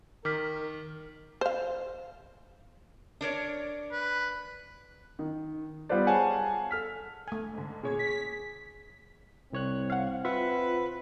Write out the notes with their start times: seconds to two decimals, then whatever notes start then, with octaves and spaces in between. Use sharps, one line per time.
0.25 D#3 A#4 D6 F6 B6
1.41 C5 F5
3.21 D4 A#4 C#5
3.92 B4
5.19 D#3
5.89 G3 B3 F4 B4 C5 D5
6.06 G#4 C#5 F5 F#5 G#5 A5
6.71 A4 F6 B6
7.28 A3 G#5
7.53 G#2 D3
7.83 A#2 G#4 C#5 G#6
7.99 B6
9.53 C2 C4 C#5 F#6
9.90 F5 F#5
10.25 F4 B4 E5 F#5